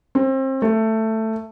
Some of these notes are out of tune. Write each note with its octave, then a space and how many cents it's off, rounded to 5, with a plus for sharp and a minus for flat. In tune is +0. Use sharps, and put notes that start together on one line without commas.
C4 +30
A3 +10